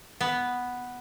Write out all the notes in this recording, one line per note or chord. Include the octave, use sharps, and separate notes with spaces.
B3